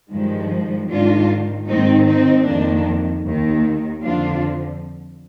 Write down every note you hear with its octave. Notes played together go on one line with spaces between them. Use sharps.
G2 D#3 F3 G#3
G#2 D#3 D4 F4
G#2 D#3 C4 D#4
C4 D#4
F2 D#3 A#3 D4
D#2 D#3
F2 D3 F3 D4 F4